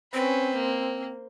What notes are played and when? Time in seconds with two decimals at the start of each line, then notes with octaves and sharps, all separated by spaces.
0.14 C4 C#4 B4 C5
0.55 A#3